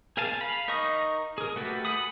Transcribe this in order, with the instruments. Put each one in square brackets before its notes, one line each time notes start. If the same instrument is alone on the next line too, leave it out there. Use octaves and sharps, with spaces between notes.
[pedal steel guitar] G#4 A#4 F5 G#5 A5
F5 B5
D#4 A#4 D#5 C#6 D#6
G#4 A#4
A3 F#4 G4 A4 B4
F#5 G#5 B5 D#6